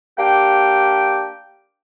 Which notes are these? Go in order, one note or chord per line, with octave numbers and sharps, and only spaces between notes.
A#3 D4 G4 G5